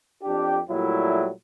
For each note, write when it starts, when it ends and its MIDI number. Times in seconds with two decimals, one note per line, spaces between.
0.23 0.59 41
0.23 0.59 62
0.23 0.59 67
0.70 1.31 46
0.70 1.31 54
0.70 1.31 55
0.70 1.31 57
0.70 1.31 64